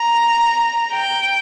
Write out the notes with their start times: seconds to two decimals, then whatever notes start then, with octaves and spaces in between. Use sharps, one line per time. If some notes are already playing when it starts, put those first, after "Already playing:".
Already playing: A#5
0.93 G5